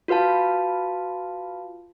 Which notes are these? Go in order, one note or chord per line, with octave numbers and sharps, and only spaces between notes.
F4 F#4 B4 F5 A5